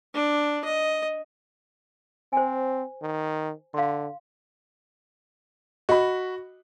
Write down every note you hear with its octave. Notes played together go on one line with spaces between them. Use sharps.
D4
D#5
C4 C5 G#5
D#3
D3 F5 C6
F#4 D#5 B5